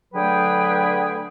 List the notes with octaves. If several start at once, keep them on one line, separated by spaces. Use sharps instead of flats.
D3 F#3 A3 G#4 B4 G5